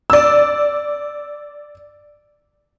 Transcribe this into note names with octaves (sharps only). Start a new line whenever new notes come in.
D5 E6